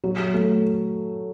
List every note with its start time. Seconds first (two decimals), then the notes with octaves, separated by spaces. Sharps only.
0.04 F#3
0.34 A3